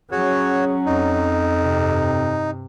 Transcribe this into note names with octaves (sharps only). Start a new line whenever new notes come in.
F#3 C#4 F#4 G#4 C#5
F2 D#4
G2 C3